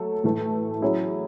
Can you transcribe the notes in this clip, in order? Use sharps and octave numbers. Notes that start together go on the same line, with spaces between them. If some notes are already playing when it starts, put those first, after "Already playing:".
Already playing: F#3 A3 A4
A2 E3 A3
F#3 C#4 E4 G#4